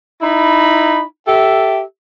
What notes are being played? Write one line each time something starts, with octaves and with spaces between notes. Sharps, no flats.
D#4 E4 A#5 B5
G4 A4 E5